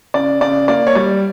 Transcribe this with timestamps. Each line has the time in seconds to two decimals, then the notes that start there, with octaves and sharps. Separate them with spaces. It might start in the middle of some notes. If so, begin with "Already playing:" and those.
0.14 C#3 D5
0.41 C#3 D5
0.68 A#3 D5
0.87 C#5
0.95 G3 D5